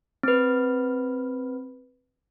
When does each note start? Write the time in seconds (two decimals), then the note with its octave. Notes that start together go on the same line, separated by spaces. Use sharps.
0.23 C4 B4